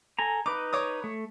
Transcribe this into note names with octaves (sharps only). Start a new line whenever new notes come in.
A4 G#5 A#5
D#4 B4 D6
C#5 D6 D#6
A3